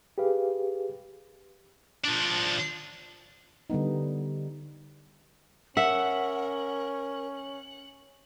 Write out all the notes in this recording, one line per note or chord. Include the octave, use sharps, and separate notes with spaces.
G4 G#4 B4 F5
F3 D4
D3 G3 B3 D#4
C#4 A#4 E5 F#5